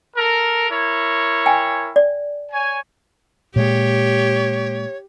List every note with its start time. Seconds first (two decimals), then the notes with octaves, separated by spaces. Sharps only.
0.17 A4 A#4
0.69 E4 A#4 C#5
1.46 G5 G#5
1.96 D5
2.52 C#5 G#5
3.56 A#2 G#3 G4 C#5